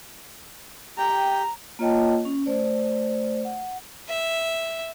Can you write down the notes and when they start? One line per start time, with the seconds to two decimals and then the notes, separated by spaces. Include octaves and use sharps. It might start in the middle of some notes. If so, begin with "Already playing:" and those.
0.98 G4 G5 A#5
1.79 A#3 F4 C#5 D#5 G5 A5
2.25 C#4
2.46 A3 C5 D5
3.45 F#5
4.09 E5